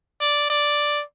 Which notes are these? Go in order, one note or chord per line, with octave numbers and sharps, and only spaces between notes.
D5
D5